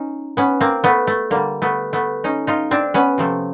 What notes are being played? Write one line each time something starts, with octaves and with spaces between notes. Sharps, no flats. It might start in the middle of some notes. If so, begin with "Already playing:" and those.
Already playing: C#4 D#4
B3 C#4
A#3 C4
A3 B3
A3
D3 G3 A#3
A3 B3
A3 B3
C#4 D#4
D#4 F4
C4 D4
B3 C#4
C3 F3 A3